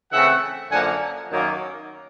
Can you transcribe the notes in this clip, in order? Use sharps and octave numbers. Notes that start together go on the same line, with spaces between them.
C#3 E3 A3 C4 E5 F#5
F#2 D3 F3 A#3 F#5 G#5
F#2 D#3 F#3 A#3